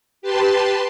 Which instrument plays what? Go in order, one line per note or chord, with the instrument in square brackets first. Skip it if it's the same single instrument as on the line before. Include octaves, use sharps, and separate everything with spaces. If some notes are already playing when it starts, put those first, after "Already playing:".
[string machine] G4 B4 A5 C6